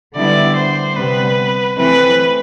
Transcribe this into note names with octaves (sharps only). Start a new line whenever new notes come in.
D3 G3 B3 E4 D5
C5
C3 G3 B3 B4
E3 A3 C4 B4